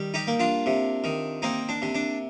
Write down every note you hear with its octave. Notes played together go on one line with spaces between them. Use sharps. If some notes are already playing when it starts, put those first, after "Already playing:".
Already playing: D#3 G3
D#4 G4
A#3
D4 F4
C3
D#3
A#3 C4 D#4
D4
C3
D4